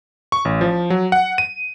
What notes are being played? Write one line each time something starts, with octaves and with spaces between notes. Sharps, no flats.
C#6
A1
F3
F#3
F#5
D#7